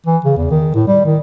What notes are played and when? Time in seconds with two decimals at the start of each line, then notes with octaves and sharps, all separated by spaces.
0.07 E3
0.25 C#3
0.37 E2
0.51 D#3
0.75 A2
0.88 G3
1.06 D#3